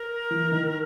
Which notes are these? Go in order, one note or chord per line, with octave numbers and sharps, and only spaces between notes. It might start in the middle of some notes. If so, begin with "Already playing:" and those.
Already playing: A#4
E3
D#3